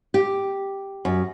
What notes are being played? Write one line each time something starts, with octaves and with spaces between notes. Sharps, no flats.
G4
F#2